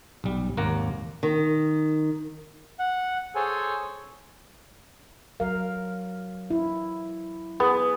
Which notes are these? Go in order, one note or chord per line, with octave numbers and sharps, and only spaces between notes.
B1 G3
G#1 D#2 A#3 F#5 A#5
D#3
F#5
G#4 A4 C5 C#5 G#5
F#3 A#4 F5
E4
B3 G#4